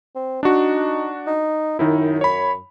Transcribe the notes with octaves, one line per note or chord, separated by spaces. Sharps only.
C4
D4 D#4 F#4
D#4
F#2 D#3 D#4 E4
C#5 B5